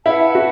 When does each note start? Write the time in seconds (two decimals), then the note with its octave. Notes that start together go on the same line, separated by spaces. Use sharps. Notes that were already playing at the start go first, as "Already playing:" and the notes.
0.06 E4 B4 F#5 A5
0.35 F#4